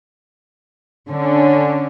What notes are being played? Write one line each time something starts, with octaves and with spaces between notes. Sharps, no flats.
D3 C#4